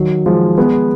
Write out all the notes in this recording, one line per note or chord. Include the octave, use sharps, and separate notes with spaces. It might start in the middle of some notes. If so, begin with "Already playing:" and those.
Already playing: D#3 F#3
F3 G#3
G#3 B3